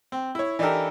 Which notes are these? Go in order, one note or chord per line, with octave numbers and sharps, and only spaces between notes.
C4
E4 C#5
E3 D4 D#4 G4 A4 A#4